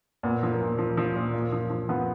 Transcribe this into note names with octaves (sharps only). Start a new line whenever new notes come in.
A#2 B3
F3
A#3
A#2
F3
F3
A#2
A#2
F3
F3
F3 B3